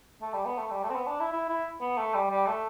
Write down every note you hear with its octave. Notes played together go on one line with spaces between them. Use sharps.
A3
G3
B3
A3
G3
A3
C4
B3
D4
E4
E4
E4
B3
A3
G3
G3
A3